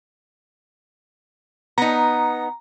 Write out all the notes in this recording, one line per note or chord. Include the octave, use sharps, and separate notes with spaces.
B3 D#4 A#5